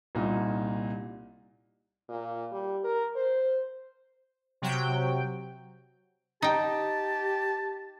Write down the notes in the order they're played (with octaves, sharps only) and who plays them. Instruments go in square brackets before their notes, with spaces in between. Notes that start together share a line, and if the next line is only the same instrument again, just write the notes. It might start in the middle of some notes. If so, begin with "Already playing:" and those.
[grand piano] C2 A#2 D#4
[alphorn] A#2
G3
A#4
C5
[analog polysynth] C3 F#3 G5
[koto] D#4 G5 [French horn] G4 [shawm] A5